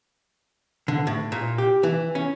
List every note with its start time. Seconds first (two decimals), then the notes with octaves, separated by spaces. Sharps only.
0.88 D3
1.07 A2
1.32 A#2
1.58 G4
1.83 E3
2.15 C#4